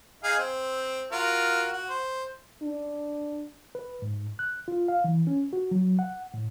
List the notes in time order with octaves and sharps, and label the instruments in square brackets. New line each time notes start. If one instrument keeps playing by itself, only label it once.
[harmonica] D#4 G#4 F5
C4
F4 F#4 A#4
F#4
C5
[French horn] D4
[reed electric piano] B4
G#2
F#6
F4
F5
E3
C#4
F#4
F#3
F#5
A2